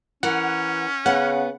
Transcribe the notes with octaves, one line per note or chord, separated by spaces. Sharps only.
E3 C#4 A#4 F#5
C#3 B3 F#5